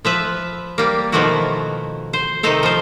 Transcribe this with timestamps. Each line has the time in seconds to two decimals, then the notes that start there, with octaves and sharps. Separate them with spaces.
0.05 F3 B4 E5
0.78 G3 A#3
1.12 B2 D#3 F3 A3 E4 F#4
2.13 C5
2.43 C3 D#3 D#4 A4 C5
2.63 F3 C5